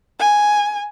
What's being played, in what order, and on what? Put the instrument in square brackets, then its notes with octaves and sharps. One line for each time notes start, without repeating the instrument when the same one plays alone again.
[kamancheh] G#5